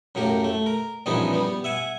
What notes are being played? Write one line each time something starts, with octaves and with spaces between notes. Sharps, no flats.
F#2 A2 A#3 G4
A3
A#4
A#1 G2 E3 B3 C#4 D#4
G3 B3
E5 F#5 G#5